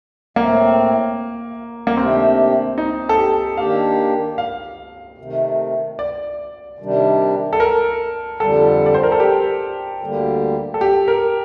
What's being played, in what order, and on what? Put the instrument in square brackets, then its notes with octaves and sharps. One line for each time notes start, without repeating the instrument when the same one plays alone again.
[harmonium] A2 A3 C4 [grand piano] A#3
[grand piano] A#3
[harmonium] C3 D#3 A3 D4 G4 [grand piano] C4
[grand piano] D#4
A4
G4
[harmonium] D#3 A#3 D4 G4 [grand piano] F5
[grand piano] F5
[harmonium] C3 D#3 A3
[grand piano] D5
[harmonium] C3 D#3 G3 D4
[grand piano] A4
A#4
[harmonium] F2 D3 G3 [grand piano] A4
[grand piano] D5
C5
A#4
A4
G4
[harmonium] D2 D3 G3 A#3
[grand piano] A4
G4
A#4